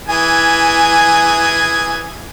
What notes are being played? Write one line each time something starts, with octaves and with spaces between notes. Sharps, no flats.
E3 G#4 G#5